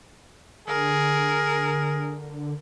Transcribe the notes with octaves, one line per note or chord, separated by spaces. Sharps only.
D3 G#4 A#4